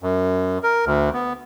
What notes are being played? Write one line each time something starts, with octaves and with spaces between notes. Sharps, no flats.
F#2
A#4
D2
B3